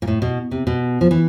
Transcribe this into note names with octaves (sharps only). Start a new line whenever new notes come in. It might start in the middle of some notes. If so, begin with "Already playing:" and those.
A#2
A2
B2
C3
B2
F3
E3